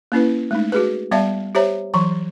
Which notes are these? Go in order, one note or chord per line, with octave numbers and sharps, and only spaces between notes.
A#3 C#4 E4 B4
G#3 A3 D#4
F#4 G#4 B4
G3 B3 D5 E5 F5 A5
G4 C5 C#5 E5 A#5
E3 F#3 A#5